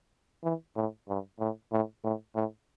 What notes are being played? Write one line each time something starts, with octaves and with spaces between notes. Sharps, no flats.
E3
A2
G2
A2
A2
A2
A2